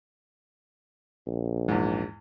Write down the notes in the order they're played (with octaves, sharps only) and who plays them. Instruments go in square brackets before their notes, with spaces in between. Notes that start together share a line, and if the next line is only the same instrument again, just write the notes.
[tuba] A#1
[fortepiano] E2 G#2